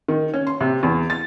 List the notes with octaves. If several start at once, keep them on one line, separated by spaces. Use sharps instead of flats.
D#3
C#4
C6
C3
E2
A6